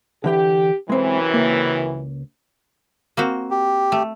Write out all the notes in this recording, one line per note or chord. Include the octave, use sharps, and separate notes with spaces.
D3 E3 G4 G5
F#2 C3 E3 G#3 C4
C#2 A#3
A#3 C4 F#4
G4
A3